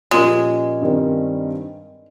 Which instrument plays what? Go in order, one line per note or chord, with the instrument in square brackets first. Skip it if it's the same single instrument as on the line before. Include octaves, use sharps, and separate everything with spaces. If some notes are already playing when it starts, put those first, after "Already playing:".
[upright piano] A#2 F3 A#3 C#4 G4 [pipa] G#3
[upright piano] G2 D#3 G3 C4